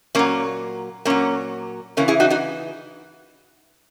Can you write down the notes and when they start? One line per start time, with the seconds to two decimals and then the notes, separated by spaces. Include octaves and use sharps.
0.15 A#2 F#3 A#3 C#4
1.05 A#2 F#3 A#3 C#4
1.97 C#3 E3 A#3 C#4
2.08 E4 G#4
2.20 D#4 F#4
2.30 D#4 F#4